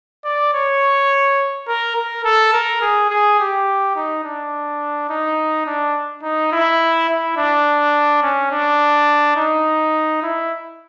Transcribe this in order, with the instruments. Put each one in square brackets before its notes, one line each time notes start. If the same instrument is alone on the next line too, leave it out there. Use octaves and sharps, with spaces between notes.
[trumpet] D5
C#5
A#4
A#4
A4
A#4
G#4
G#4
G4
D#4
D4
D#4
D4
D#4
E4
E4
D4
C#4
D4
D#4
E4